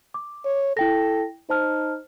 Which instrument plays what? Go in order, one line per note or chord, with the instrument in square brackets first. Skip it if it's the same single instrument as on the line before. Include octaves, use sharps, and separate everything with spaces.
[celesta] D6
[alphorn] C#5
[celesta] E4 G5 A#6 [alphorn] A4
[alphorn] D#4 [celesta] C5 A5 F6